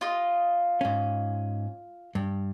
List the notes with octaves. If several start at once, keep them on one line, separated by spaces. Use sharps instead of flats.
F4 D#5
G#2 C#4
G2